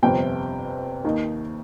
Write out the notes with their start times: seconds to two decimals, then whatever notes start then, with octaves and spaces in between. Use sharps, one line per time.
0.03 G1 F2 C3 G5
1.04 D#2 D#3 A#3 D#4